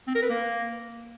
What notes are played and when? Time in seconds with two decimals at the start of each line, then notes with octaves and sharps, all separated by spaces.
0.07 C4
0.15 A#4
0.22 B4
0.30 A#3